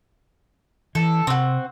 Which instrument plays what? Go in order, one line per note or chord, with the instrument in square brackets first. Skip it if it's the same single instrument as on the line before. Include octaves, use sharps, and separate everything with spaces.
[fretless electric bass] E3 [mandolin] A4
[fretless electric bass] C3 [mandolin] C4 F#4